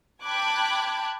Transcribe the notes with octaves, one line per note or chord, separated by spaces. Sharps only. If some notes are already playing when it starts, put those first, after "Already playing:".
G5 A5 B5 D6 F#6 G#6